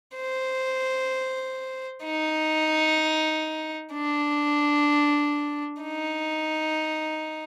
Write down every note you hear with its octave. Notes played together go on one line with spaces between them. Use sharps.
C5
D#4
D4
D#4